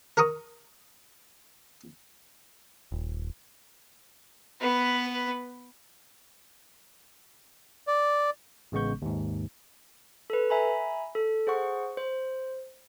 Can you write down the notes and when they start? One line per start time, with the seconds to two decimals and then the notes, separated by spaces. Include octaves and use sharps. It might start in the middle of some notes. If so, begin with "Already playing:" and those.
0.17 A#4 A#5 C#6 D#6
2.92 D#1
4.61 B3 B4
7.87 D5
8.72 A1 C#3 G#3 B3 C#6 G6
9.02 D#2 G#2
10.30 A4 B4
10.50 E5 G#5 A#5 B5
11.15 A4
11.47 G#4 C5 F#5 C#6
11.97 C5